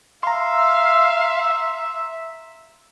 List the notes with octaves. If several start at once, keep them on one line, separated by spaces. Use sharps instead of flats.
E5 F5 A#5 C6